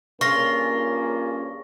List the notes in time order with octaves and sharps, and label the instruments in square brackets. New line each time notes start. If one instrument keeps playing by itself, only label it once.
[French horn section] G2 C#4 G#4 [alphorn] A#3 [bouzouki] F4 [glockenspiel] C#6 A#6